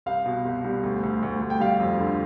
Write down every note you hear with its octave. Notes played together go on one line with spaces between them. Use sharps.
C2 F5
B2
C2
G3
D2
D2
D2
D2
G5
G3 F5
F2
D3